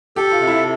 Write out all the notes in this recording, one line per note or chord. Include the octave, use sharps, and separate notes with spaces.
G4 A4
F4
C3
E4